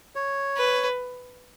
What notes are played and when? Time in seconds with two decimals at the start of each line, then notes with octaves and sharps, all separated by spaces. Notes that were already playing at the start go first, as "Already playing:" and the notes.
0.16 C#5
0.57 B4